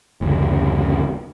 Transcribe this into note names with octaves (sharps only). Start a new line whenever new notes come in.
F#1 D2